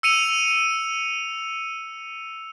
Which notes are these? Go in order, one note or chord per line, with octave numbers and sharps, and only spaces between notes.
E6 C#7 D#7 F7